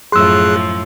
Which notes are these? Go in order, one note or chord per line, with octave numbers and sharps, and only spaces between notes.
F#2 A2 F3 G#4 C6 E6 F#6